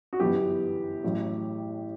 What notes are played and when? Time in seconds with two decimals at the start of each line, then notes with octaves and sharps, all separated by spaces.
0.13 F#4
0.20 G1 F#2 E3 B3 G4
1.04 A1 A2 F#3